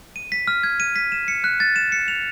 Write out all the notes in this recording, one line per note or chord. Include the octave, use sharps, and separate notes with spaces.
D#7
B6
F6
G#6
D#7
B6
E7
C#7
F#6
A6
E7
C#7
F7